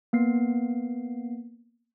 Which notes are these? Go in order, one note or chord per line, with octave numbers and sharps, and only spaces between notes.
A#3 B3 C7